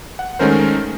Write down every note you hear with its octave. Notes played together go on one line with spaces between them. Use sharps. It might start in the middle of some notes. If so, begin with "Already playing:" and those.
F#5
D#3 G#3 A3 C#4 A#4 C5